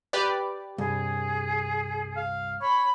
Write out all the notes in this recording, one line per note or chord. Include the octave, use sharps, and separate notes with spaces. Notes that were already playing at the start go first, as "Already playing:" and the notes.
G4 B4 D5
C2 G2 G#4
F5
C#5 B5